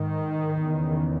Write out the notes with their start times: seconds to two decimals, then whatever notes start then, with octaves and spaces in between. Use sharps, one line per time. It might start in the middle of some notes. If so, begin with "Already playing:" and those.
Already playing: G#2 D#3
0.63 E2 C#3